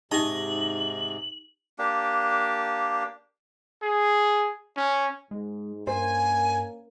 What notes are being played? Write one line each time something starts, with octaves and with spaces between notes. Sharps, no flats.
G#2 C3 D#4 G4 D#5 G#5 A5 F#7
A#3 D4 G4
G#4
C#4
G#2 G#3
G2 A#3 C#4 A#4 C5 G#5